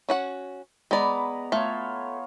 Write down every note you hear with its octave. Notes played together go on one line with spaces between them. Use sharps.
C#4 F#4 F#5
G#3 B3 D5 A#5 B5
A3 F4 C#5